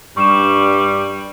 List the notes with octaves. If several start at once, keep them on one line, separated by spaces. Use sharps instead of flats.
G2 G3 C#6 E7